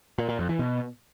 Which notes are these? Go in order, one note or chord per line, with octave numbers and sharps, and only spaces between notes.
A#2
A#2
F2
E3
B2